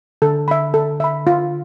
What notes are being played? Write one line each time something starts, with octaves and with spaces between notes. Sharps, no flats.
D3 A4
E5 B5
A4
E5 B5
F4